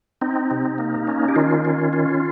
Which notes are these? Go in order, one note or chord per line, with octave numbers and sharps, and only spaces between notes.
C4 D#4
C3
A#3
C#4
G4
D#3 F4
C#4
C#4 F4